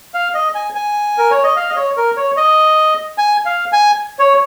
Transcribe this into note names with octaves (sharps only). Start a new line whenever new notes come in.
F5
D#5
G#5
G#5
A#4
C#5
D#5
F5
D#5
C#5
A#4
C#5
D#5
G#5
F5
G#5
C#5